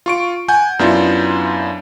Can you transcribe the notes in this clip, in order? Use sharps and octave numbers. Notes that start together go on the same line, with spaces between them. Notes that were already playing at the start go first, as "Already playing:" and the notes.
F4 C#6 D7
F#5 G#5 G6
F#2 B3 D4 E4 F4